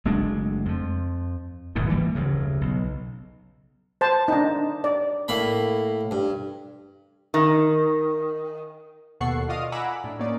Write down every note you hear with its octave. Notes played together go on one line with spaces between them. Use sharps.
F#1 G#3 A3 D4
F2 F3
G#1 D2 G#2 B2
E3 G3 A#3
F1 D2 G2 C#3
B1
C5 A5
D4 D#4
D5
A2 A#3 B5
G2
D#3
D#2 B2 A4 F#5 C#6 C7
F4 D5 D#5 F5 D#6
F#5 G#5 A#5 B5 D6 E6
A2 D4
A#3 C#4 D#4 D5